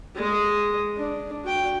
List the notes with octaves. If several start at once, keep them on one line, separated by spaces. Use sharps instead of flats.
G#3 D#5
D4
F#4 G5